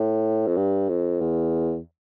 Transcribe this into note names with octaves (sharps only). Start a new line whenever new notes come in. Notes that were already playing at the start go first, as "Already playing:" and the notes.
Already playing: A2
F2
G2
F2
E2